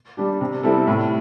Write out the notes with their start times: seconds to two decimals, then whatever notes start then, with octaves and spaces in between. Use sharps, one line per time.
0.17 G3 D4 G4
0.41 C3
0.63 G3 C4 E4 A4
0.87 A2